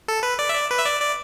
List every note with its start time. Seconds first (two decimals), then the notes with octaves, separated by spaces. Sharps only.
0.08 A4
0.23 B4
0.39 D5
0.49 E5
0.55 D5
0.71 B4
0.79 E5
0.86 D5
1.01 D5